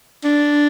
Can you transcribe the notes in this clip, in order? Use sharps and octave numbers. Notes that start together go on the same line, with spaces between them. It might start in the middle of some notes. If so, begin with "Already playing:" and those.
D4